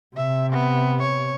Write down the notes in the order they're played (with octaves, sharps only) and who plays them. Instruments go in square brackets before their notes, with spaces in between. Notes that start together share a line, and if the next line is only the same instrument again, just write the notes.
[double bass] C3 [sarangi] E5
[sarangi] B3
C#5